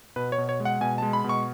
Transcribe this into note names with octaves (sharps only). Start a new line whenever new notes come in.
B2 B4
C#5
B2
C#5
G#3
F#5
B2 G#5
G#3 A5
B5
B2
C#6